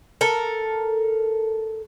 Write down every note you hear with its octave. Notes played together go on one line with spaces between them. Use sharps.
A4 A#4